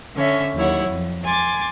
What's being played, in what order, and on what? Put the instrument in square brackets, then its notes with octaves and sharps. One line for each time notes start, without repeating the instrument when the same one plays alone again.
[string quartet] D3 C#4 C#5 E5
D#2 F#3 E4 C#5 F#5
F2
G#5 C6 D6 A6